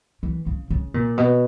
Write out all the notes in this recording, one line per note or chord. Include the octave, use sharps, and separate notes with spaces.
E3
C#3
C#3
A#2
B2